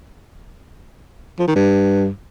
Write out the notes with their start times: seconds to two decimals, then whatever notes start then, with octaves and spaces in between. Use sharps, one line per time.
1.39 F3
1.48 D#3
1.56 G2